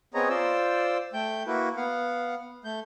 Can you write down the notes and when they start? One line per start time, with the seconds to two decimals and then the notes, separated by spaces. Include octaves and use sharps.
0.14 B3 C4 G#4 C#5 D#5 A#5
0.29 F4 C5 D5 E6
1.13 A3 G5 G6
1.47 A#3 E4 F#4 B4
1.77 B3 F5 F#5
2.64 A3 G6